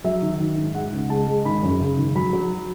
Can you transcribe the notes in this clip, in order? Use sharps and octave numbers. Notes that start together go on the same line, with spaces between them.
F#3 E5
D#3
D#3
G#2
G#3 F#5
C#2
G#3 A5
G#3
G#1 B5
F#2
C#3
G#1
F#3 B5
F#3